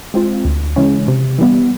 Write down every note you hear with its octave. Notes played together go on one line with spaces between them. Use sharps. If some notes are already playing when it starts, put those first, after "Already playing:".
G#3 C4 F4
D2
C#3 E3 G#3 C#4
C3
E3 G3 B3